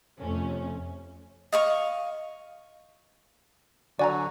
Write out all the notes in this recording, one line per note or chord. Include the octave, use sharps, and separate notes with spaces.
F2 C3 A3 C#4
D#5 F5 C#6
D3 F#3 F#4 D5 G#5 A#5